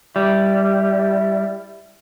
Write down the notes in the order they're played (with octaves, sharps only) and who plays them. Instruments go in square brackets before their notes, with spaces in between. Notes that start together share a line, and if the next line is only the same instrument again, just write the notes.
[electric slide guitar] G3 [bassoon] E4